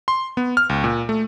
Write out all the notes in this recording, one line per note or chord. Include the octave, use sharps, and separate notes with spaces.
C6
B3
F6
C#2
A#2
A3